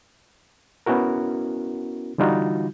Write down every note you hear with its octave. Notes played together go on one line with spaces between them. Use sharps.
B3 C#4 E4 F#4 A#4
D3 E3 G3 D#4 F4 F#4